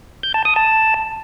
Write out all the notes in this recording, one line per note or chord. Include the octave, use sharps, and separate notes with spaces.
G6
A5
D#6
A5